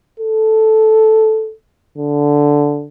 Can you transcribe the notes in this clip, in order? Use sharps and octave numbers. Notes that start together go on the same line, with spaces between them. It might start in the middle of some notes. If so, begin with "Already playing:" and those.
A4
D3